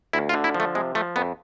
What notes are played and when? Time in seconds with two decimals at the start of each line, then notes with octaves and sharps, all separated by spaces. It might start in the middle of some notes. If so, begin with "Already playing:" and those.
0.13 D2 E4
0.29 F4
0.34 D3
0.44 E4
0.54 F3
0.60 A3
0.75 C3 G#3
0.95 F3 A3
1.16 F2 B3